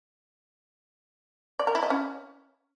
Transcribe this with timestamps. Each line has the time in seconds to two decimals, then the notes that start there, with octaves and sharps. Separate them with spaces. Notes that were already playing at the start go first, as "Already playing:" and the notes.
1.59 D5
1.67 A#4
1.75 E4
1.83 D#5
1.90 C#4